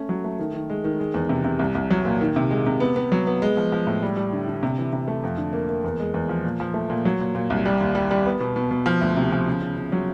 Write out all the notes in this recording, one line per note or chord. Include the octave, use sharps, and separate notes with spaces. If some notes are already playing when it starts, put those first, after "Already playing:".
Already playing: A3 C#4
F#3
A3
D#3
D#3
G#3
D#3
G#3
E2
C3
C3
C2
C2
F#3
A#2
D#3
C3
G#3
C3
B3
B3
F#3
B3
G#3
F3
F3
A2
G3
G3
D3
D3
C3
E3
C3
A3
F2
D3
A#3
A#3
E2
G#3
E2
F3
A#2
F3
A3
A#2
F#3
A#2
A#2
C2
G3
D#2
G3
G3
B3
B2
B2
B2
F3
D2
C3
F3
C#3
C#3
C#3
F#3